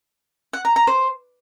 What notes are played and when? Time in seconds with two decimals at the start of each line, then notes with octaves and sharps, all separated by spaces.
0.53 F#5
0.65 A#5
0.76 A#5
0.87 C5